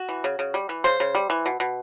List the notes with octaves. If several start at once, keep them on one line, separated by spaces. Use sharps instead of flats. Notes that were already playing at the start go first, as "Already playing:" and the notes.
Already playing: F#4
E3
C#3
C#3
G3
E3
C#3 C5
C#3
G3
E3
B2
B2